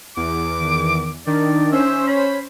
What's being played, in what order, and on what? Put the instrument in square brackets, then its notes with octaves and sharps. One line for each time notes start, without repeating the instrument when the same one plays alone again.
[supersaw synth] E2 [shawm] D6
[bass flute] D#3
[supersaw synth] D#3 [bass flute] D4 [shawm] D5
[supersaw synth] C#4 C5 [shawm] E5
[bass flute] C#5 [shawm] B5